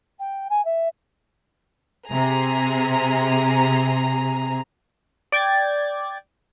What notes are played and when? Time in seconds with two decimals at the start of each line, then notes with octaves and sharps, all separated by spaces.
0.19 G5
0.50 G#5
0.65 E5
2.08 C3 G#4 A#5
5.32 D5 G5 G#6 A6